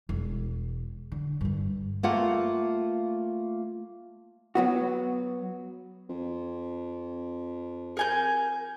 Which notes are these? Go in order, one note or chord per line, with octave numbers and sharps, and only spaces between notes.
E1
D3
G2 D3
A3 A#3 F4 F#5
F#3 B3 F#4
F2
A#4 G#5 G6